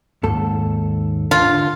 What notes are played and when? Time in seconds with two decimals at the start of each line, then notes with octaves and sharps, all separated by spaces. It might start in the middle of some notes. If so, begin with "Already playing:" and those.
0.23 D#2 G#2 A4
1.31 D3 F4